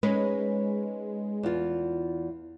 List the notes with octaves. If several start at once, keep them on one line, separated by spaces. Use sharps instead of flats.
G#3 C#4 D#4 B4
E2 F4